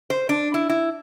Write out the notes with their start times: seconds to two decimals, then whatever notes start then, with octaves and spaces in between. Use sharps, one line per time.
0.10 C5
0.29 D4
0.54 E4
0.69 E4